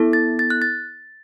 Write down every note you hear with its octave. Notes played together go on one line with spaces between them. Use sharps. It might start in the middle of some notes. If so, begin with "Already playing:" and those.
Already playing: B3 E4 A4
A6
A6
F#6
A6